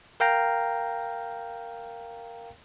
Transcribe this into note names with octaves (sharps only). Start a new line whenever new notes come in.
A#4 F5 G5 A#5